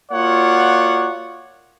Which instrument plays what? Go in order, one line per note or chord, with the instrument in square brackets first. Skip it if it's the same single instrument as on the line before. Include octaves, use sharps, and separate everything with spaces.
[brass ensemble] A#3 F4 F#4 C#5 D5 F#5